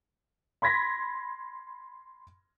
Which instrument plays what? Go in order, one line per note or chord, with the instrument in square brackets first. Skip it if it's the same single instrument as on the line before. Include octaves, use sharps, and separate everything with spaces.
[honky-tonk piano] B5 C6 G#6 A#6 B6